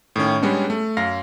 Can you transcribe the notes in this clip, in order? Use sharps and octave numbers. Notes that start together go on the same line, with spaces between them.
A2 D#3 C#4
G3 G#3 B3 C#4 D4
A3
F#2 F5 A#6